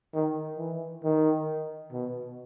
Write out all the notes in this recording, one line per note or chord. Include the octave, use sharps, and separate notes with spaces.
D#3
E3
D#3
B2